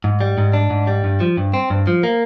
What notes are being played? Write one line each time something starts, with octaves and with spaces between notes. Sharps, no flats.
G#2
G3
G#2
D4
G#2
G3
G2
F3
G2
C4
G2
F3
A#3